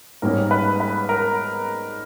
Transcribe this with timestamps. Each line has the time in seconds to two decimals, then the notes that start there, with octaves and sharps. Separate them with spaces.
0.22 G#2 G3 A#3 C#4 A#4
0.51 B4
0.80 B4
1.09 A#4